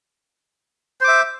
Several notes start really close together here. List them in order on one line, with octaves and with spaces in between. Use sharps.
C5 D6 E5